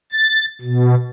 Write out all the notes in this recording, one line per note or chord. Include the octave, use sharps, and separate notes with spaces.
A6
B2